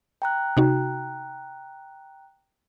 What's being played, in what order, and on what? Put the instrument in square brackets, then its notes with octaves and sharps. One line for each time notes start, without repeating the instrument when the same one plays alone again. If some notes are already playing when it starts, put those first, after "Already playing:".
[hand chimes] G5 A#5 F#6
[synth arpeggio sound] C3 D#4 F#4